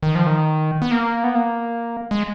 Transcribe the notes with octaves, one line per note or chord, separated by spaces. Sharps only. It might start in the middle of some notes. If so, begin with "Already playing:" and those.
D#3
F3
D#3
B3
A#3
B3
A#3
G#3